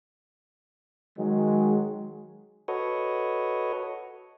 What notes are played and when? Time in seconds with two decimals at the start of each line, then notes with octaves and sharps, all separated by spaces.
1.19 D#3 F#3 G#3
2.68 F#4 A4 B4 C#5 D#5